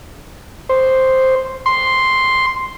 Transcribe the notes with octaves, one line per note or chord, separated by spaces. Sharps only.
C5
C6